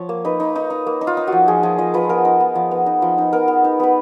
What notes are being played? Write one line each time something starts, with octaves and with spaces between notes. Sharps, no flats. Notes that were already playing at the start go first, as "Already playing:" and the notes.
Already playing: F3 C#5
A#3
D#4 B4
D#4
D#4
D#4
A#3
D#4
F4
D#4
F3 F#4
F3 G#4
F3 G#4
F3 D#5
F3 B4
B3 A#4
D#4
B3
F3
B3
D#4
F3
D#4
B3 A#4
B3
D#4
B3 B4